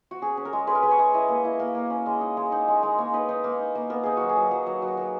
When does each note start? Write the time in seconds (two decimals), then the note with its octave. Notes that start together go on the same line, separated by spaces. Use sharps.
0.11 F#4
0.22 C#4 G#4
0.37 C#4
0.45 A#4
0.53 G#3
0.67 G#3 B4
0.75 A#4
0.82 G#3 B4
0.91 C#5
0.99 G#3
1.14 E4 D#5
1.29 A#3
1.44 E4
1.59 A#3
1.75 A#3
1.90 C#4
2.06 G#3 D#5
2.21 D#4
2.37 G#3
2.52 D#4
2.68 G#3
2.83 G#3
2.98 A#3 C#5
3.13 D#4 B4
3.29 D#4
3.44 A#3
3.60 D#4
3.75 A#3
3.90 B3 A#4
4.03 D#4 G#4
4.17 F#3 F#4
4.29 G#4
4.36 F#3
4.51 F#3
4.67 F#3
4.82 F#3
4.97 F#3